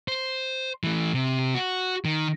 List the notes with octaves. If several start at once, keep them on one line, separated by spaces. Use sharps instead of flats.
C5
E3 A3
C3
F#4
D#3